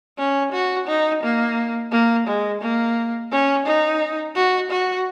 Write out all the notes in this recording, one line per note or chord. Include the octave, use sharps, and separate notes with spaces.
C#4
F#4
D#4
A#3
A#3
G#3
A#3
C#4
D#4
F#4
F#4